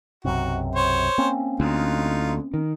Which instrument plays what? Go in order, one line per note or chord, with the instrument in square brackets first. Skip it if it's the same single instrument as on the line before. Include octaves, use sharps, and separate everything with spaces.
[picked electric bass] B1 F#2 C3 [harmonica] F#4
[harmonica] C5 C#5
[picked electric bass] A#3 C4 C#4
[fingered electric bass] D2 [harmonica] D#4 F4
[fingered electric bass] D#3